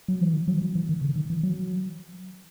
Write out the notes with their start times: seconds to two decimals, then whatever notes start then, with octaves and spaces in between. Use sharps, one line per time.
0.08 F#3
0.21 E3
0.33 D#3
0.48 F#3
0.62 F#3
0.75 E3
0.89 D#3
1.02 C#3
1.16 D#3
1.30 E3
1.43 F#3